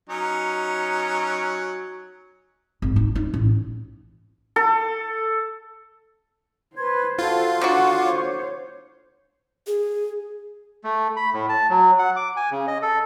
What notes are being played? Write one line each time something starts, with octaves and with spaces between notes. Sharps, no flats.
F#3 C#4 D#4
G#1
D#4
D#4
A1
A4
B4 C5 C6 G#6
F4 F#4 A4
D3 F#3 F#4 F#5 C#6 D6
C5 C#5
G#4
A3
B5
A2
A5
F#3
F#5
D6
G#5
C#3
D#5
A4